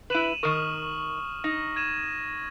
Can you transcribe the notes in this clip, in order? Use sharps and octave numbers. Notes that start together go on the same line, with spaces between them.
E4 B4 D#7 E7 F#7
D#3 A#4 C#6 D#6 F6
D#4 A#6
G#6 D#7 E7